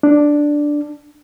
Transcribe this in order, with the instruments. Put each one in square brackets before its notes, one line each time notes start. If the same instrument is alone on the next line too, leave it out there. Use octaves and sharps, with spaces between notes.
[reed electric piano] D4